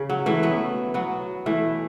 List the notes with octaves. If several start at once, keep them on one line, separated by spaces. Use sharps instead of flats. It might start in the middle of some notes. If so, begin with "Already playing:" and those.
Already playing: C#3
F#3
E3 A3
F#3 B3
F#3 B3
E3 A3